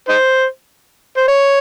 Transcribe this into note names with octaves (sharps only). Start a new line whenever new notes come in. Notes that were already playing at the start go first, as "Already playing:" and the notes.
D#4 C5
C5
C#5